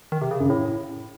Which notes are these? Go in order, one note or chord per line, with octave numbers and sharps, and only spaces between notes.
D#3
C3
C#3
F#2
A2